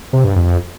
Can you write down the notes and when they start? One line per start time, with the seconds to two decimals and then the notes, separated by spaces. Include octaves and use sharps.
0.13 C3
0.24 G2
0.36 F2